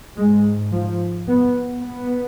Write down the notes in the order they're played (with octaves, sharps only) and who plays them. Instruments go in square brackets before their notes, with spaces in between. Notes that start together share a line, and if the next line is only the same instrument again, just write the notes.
[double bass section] G#2 G#3
F3
B3
B3